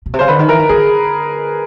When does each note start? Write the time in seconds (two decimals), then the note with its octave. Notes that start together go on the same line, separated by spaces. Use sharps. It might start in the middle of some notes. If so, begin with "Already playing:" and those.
0.06 B2
0.13 C3
0.19 C#3 C5
0.28 D3 B4
0.39 D#3
0.48 E3 A#4
0.59 D#3
0.69 D3 G#4